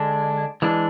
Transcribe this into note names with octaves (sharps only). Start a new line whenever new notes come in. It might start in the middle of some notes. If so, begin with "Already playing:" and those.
Already playing: D3 G#3 D4
E3 G#3 D4